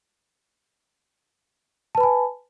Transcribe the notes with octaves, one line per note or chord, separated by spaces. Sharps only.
B4 G#5 A5 B5